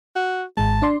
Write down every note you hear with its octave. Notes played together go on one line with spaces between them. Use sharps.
F#4
G#1 G#3 A5
D4 D5 C6